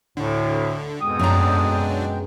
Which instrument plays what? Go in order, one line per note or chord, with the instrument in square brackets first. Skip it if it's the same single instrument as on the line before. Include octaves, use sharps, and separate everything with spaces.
[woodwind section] D2 A2 [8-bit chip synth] D3
[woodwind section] F2 G#2 D#6 [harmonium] B2 G#3 G5
[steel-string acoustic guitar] F#2 A#5 [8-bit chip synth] F#3 D4